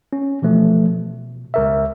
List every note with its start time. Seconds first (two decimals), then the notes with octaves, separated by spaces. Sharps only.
0.13 C#4
0.42 B2 E3 F3 A3
0.88 B2
1.54 C#2 A#4 E5